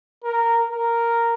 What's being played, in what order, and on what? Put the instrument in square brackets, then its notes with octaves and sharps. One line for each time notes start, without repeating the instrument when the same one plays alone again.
[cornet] A#4
A#4